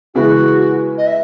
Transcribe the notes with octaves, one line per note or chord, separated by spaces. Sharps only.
C#3 E3 G#3 B3 E4 F#4
D#5
E5